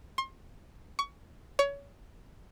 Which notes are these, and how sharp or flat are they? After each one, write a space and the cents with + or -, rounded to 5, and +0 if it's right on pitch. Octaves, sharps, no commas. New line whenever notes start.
C6 +35
C#6 +25
C#5 +25